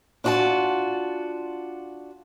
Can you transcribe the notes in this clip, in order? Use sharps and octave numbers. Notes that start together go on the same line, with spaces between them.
D4 F4 F#4 D5 A5